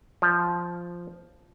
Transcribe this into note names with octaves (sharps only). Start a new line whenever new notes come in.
F3